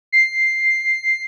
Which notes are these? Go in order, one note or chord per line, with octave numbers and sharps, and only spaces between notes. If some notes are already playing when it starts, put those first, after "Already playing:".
C7